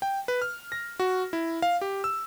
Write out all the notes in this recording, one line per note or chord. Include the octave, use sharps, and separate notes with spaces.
G5
B4
F6
A#6
F#4
E4
F5
G4
E6